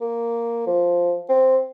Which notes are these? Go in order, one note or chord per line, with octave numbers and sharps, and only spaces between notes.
A#3
F3
C4